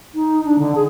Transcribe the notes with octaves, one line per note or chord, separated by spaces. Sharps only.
D#4
D4
D3
G#4